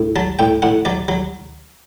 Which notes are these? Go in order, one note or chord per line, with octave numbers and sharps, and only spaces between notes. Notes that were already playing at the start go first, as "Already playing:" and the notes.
Already playing: A2
F#3 A5
A2 G5
A2 F#5
F#3 D5
F#3